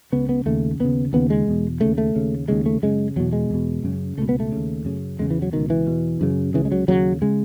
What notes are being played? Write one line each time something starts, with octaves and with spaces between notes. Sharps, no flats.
C#2 C#3 B3
B3
D#2 C#3 A3
D#2 C#3 B3
D#2 C#3 B3
G#3
E2 B2
D#2 C#3 A3
A3
D#2 C#3
D#2 C#3 G#3
A3
F#2 C#3 G#3
E2 B2 F#3
G#3
E2 B2
F#2 C#3
C#2 B2 A3
B3
A3
D#2 C#3
F#2 C#3
E2 C#3 G#3
E3
F#3
C#2 B2 D#3
E3
E2 B2
F#2 C#3
C#2 C#3 E3
G#3
F#3
D#2 C#3 F#3
C#3 G#3